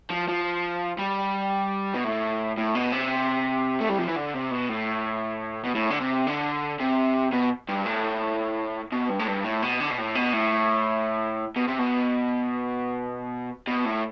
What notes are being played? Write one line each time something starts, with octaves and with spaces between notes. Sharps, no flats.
F3
F3
G3
B2
A2
A2
B2
C3
A3
G3
F3
E3
D3
C3
B2
A2
B2
A2
D3
C3
D3
C3
B2
G2
A2
B2
G2
A2
G2
A2
B2
D3
B2
A2
B2
A2
B2
C3
B2
B2
A2